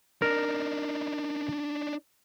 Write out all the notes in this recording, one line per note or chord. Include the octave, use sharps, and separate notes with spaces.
D4 D#4 A#4